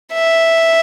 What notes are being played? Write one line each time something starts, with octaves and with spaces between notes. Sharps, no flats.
E5